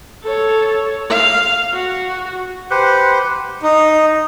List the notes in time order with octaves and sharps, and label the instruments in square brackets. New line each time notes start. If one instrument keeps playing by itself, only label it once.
[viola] A4 C#5
F5
F#4
[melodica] G4 B4 C5 F#5
[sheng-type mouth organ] D#4